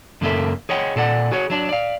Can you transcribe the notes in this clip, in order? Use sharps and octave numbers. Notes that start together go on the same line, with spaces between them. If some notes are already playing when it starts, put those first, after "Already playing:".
F#2 C#3 A#3 C#4 A4 E5
G#4 C#5 D#5 F#5 G5
A#2 A4 D5 F#5
F#4 G#4 C#5
F#3 D4 D5
D5 F5